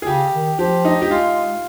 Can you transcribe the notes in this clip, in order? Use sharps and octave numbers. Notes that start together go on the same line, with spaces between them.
G#4
C#3 G4
D#3
F3 G4
D#4
G4
G#3 F4